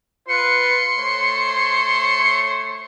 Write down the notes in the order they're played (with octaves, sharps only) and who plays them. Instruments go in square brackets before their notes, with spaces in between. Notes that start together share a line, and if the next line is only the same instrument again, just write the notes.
[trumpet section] F4 B4 [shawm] C6 [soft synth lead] C#7
[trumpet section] A3 C5 C#5